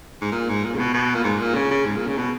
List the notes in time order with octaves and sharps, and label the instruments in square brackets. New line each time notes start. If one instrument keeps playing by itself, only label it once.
[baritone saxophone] G#2
A#2
G#2
A#2
C#3
B2
B2
A#2
G#2
A#2
C#3
C#3
G#2
A#2
C#3
B2